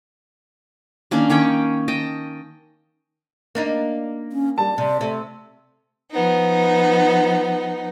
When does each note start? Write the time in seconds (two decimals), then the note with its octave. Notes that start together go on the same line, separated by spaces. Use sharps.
1.11 D#3 A#3 C#4 D4
1.30 D#3 C#4 C#5 G5
1.88 D#5 G5 A5
3.55 A#3 D4 D#4
4.32 C#4
4.58 G3 A5
4.78 C3 D5
5.01 C3 A3
6.12 F3 B3 D#4